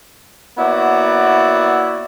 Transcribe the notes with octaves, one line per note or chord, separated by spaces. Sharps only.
A#3 B3 E4 F#4 C#5 D5